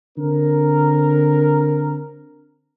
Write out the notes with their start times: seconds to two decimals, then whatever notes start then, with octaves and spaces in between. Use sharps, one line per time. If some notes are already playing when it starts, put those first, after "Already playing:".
0.18 D3 C4 A#4